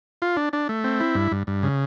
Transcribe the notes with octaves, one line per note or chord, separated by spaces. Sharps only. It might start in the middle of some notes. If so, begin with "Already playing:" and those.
F4
D4
D4
A3
C4
E4
G2
G2
G2
C#3